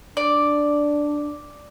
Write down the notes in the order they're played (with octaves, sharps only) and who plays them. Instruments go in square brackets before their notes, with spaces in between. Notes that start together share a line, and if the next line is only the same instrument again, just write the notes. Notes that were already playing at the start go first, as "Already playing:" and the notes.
[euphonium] D4 [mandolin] D5